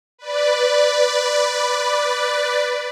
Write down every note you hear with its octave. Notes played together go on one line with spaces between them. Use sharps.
B4 D5